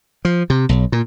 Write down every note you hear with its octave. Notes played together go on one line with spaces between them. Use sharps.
F3
C3
B1
A#2